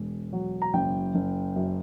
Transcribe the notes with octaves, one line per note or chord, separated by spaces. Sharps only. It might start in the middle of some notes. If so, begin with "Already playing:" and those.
Already playing: E1
F#3
A#5
F#1 G5
F#1
F#2